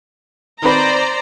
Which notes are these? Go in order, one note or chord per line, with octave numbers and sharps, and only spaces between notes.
D#3 C4 B4 C5 D5 A#5